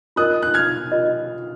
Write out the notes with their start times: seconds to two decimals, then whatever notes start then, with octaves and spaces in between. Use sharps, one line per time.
0.16 F4 A#4 D#5 D#6 F#6
0.43 F#6
0.54 F6 G#6
0.92 F4 A#4 D#5